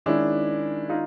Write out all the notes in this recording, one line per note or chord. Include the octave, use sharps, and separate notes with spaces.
D#3 G#3 C#4 D4 E4
D#4 F4